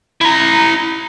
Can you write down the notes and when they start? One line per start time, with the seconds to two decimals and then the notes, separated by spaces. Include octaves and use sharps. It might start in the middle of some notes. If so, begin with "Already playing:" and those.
0.21 E4 A#5